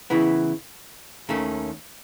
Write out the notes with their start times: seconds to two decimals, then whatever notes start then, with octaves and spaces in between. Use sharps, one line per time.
0.10 C#3 E3 B3 E4
1.29 D#2 D#3 A3 C#4